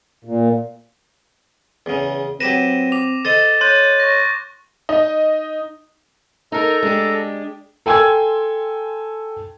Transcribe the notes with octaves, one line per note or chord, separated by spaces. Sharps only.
A#2
E2 C#3
F#3 C4 G4 B4 A#6 D#7 E7
D6 F7
A4 C5 D#5 A6
C#5 C6 F#6 G6 A6 D#7
C#6 A#6
D#4 D#5
D#4 A4 A#4 A#5
G#3 D4 G4
A4 G5 G#5 C6 E6 G#6